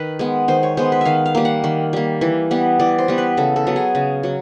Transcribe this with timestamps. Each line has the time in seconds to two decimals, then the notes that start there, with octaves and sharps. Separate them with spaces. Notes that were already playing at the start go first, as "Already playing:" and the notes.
Already playing: D#3 B4
0.19 G#3 B3
0.48 D#3 C5
0.63 C#5
0.77 G#3 B3 C5
0.92 B4
1.01 D#3 E5 F5
1.26 F5
1.35 G3 A#3
1.45 F#5
1.64 D#3
1.93 G3 A#3
2.21 E3
2.51 G3 B3
2.79 E3 D5
2.98 C5
3.08 G3 B3
3.18 B4
3.37 C#3 A4
3.56 A4
3.67 F#3 B3
3.76 G#4
3.95 C#3
4.23 F#3